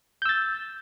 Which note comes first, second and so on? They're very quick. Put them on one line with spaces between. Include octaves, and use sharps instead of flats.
G6 E6 A6